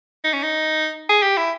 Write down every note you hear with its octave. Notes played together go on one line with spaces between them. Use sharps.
D#4
C#4
D#4
G#4
G4
E4